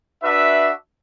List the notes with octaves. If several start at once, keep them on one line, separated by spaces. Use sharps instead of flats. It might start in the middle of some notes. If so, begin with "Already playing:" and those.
D4 F#4 B4 E5